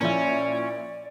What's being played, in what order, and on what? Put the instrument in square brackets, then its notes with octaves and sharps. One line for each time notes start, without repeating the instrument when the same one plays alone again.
[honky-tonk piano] A#2 F3 E4 [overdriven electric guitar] C#4 [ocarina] D5